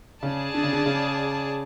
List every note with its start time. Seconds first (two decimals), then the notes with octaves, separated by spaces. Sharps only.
0.23 C#3 G#4 D5 A5
0.54 D3
0.63 C#3
0.73 D3
0.86 C#3